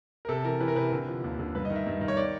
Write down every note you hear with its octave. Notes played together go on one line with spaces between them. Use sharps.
A#4
C3 A4
E3 A#4
E3 B4
A#4
C3 B4
D3
F3
D#2
D3
G2 B4
D#5
D#3
E5
G2
D#3
C#5
D5